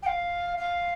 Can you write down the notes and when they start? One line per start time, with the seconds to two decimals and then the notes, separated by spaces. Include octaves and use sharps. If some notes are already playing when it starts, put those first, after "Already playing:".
0.03 G5
0.06 F5
0.57 F5